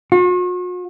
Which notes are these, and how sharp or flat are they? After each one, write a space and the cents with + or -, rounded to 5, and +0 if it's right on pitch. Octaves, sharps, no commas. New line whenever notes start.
F#4 -45